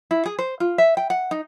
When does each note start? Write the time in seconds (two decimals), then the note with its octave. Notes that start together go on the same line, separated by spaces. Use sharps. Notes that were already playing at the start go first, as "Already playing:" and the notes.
0.11 E4
0.26 G#4
0.39 C5
0.60 F4
0.78 E5
0.97 G5
1.10 F#5
1.31 D#4